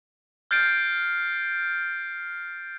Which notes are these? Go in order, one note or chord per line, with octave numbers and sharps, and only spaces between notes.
F6 G6 A6 C7 D7